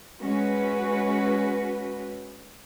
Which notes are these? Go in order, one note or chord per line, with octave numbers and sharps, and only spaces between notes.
G#3 C#4 F#4 B4